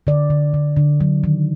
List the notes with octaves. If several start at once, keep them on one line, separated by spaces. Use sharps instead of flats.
D3 D5
D3
D3
D3
F#3
D#3